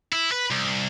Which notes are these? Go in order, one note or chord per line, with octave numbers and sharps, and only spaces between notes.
E4
B4
C2